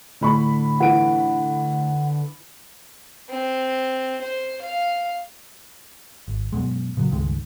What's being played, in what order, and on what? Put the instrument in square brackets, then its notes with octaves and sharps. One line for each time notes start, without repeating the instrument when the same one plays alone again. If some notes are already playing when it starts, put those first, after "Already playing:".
[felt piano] A2 B5 C#6 [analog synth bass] D3
[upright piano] E3 D7 [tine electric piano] F#5
[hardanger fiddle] C4
C5
F5
[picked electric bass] G#1
F#2 B2 G#3
A#2 C#3 F#3
C#2 G2 D#3 G#3